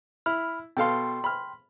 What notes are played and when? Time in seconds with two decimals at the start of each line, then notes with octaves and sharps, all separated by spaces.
0.26 E4 B5 F6
0.77 B2 A4 F5 G5 C6
1.24 B5 F6